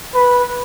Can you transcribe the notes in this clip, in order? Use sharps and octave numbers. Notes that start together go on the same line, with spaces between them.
B4